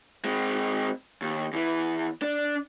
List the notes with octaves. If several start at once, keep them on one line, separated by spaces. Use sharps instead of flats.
G#3 C4
D#2
E2 E3
D4